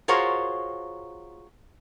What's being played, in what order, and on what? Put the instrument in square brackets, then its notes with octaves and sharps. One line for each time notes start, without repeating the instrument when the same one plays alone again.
[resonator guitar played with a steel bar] F4 F#4 G#4 A#4 C5 C#5